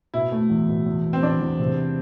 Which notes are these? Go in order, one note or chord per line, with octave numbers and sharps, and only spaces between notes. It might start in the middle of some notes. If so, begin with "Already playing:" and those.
B2 E4
A3
E2
B2
E2
E2
C4
E2 D4
E2
C3